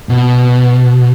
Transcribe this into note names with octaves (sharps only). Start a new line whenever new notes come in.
B2